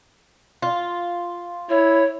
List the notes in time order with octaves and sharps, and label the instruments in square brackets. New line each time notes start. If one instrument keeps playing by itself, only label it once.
[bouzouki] F4
[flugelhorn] E4 [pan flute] C#5